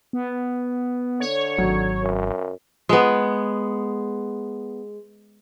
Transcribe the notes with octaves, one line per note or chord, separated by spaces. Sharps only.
B3
D3 C#5
G#1 F#3
F#2
G#3 B3